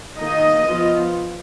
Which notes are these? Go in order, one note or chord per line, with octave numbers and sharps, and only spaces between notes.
D#3 A#3 D#4 D#5
F3 B3 F4